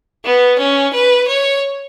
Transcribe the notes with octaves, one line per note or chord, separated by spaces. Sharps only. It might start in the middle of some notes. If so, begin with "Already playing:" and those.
B3
C#4
B4
C#5